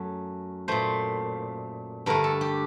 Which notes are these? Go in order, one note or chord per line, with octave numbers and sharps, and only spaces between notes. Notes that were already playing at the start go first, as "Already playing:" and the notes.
Already playing: F#2 F#3 A3
A#2 A3 C5
G2 D3 A3 A#4
A4
G4